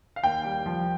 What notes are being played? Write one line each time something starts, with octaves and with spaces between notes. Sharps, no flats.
F5
D#2 G5
G3
F3